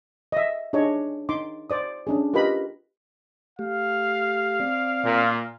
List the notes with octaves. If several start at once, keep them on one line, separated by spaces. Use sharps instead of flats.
D#5 E5
D4 D#4 G#4 C#5 D#5
D#4 C6 D6
C5 D5 D#6
C#4 D4 G#4
F4 G4 A#4 B4 D#5 B5
A3 G4 F5
C4 D5
A#2